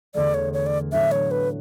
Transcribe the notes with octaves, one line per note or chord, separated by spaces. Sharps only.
E2 D3 A3 D5
C#5
C#5
D5
A2 F#3 B3 D4 E5
C#5
B4